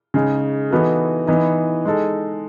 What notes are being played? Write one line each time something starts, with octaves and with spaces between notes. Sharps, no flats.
C#3 G#3 D#4 G#4
E3 B3 D#4 F#4 A4
E3 B3 D#4
G#3 D#4 A4